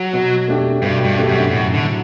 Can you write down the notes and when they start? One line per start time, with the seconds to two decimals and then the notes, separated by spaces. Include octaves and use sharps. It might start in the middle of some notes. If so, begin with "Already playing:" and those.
Already playing: F#3
0.13 B2
0.48 A3 D4 G4
0.82 G2 B2
1.05 G2
1.16 A3 D4 G4
1.28 F#2
1.50 F#2 A2
1.74 D3
1.85 F#3